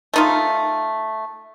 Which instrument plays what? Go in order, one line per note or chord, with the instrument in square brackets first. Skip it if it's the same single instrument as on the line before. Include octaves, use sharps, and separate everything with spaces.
[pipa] A3 D#4 F4